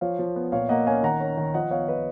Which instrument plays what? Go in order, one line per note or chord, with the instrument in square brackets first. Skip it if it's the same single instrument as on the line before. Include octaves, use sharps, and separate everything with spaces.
[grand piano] F3 C#5 F5
F3
B3
A#2 C#5 F5
A#3 D#5 F#5
C#4 F5 G#5
D#3 F#5 A#5
C#4
D#3
F3 D#5 F#5
B3 C#5 F5
F3 B4 D#5